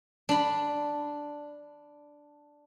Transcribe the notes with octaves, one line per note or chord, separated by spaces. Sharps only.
D4 B5